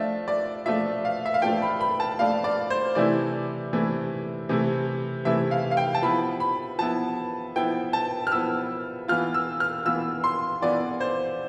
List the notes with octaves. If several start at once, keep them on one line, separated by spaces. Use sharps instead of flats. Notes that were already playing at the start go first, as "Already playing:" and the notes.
Already playing: F3 A3 D4 F4 E5
D5
F3 A3 D4 F4 E5
F5
E5
F5
F3 A3 D4 F4 G5
B5
B5
A5
F3 A3 D4 F4 F5
D5
C5
C3 E3 A3 E4 D5
C3 E3 A3 E4
C3 E3 A3 E4
C3 E3 A3 E4 E5
F5
F5
G5
A5
F3 B3 E4 B5
B5
F3 B3 E4 A5
F3 B3 E4 G5
A5
F6
F3 B3 E4 E6
E3 B3 F4 F6
E6
F6
E3 B3 F4 E6
C6
E3 B3 F4 D5
C5